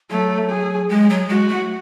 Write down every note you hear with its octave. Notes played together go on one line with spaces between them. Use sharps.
F#3 A3
G#4
G#3 G#4
F#3
G#3 F#4
A3